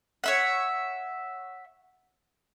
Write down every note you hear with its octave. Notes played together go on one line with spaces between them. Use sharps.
C#5 E5 F#5